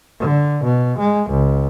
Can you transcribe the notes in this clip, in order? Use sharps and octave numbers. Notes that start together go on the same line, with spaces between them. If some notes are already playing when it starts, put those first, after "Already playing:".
D3
B2
G#3
C#2